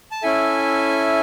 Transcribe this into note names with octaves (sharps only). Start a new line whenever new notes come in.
A5
C#4 E4 A4 E5 G#5